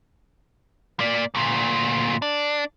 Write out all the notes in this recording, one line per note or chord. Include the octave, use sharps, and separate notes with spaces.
A#3 D5
D2 A#2
D4